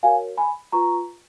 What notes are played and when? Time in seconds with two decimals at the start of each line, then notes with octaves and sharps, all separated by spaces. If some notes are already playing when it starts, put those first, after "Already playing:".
0.03 F#4 A#4 C#5 F5 G#5
0.37 G#5 B5
0.72 F4 B4 A#5 C#6